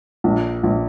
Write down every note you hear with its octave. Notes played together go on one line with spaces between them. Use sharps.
A#1
A#1